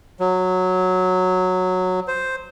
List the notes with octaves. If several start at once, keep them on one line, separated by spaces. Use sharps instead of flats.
F#3
C5